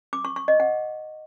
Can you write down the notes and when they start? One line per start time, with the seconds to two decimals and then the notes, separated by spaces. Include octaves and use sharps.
0.13 D6
0.25 C#6
0.36 C#6
0.48 D#5
0.60 F#5